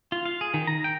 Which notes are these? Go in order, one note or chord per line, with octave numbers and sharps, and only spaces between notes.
F4
F5
G#4
D#3
A#5
G5